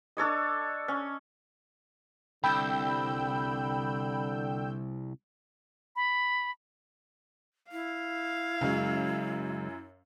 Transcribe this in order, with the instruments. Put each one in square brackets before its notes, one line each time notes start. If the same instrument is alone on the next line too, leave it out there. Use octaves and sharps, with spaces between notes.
[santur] D4 A4 C#5 D#5
C#4
[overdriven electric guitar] C2 [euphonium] D3 [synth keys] G5 E6 G6 [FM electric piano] B5
[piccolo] B5
[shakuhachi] E4 [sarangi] F5
[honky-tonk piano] F#2 [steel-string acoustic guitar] C#3 F#3 G#3